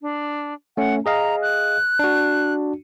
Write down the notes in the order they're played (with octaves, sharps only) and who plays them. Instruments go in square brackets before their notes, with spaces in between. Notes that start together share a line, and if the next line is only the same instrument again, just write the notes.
[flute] D4
[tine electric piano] A3 C#4 [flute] F#5
[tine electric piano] G#4 D#5 F5 [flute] A#5
[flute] F#6
[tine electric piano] D4 F#4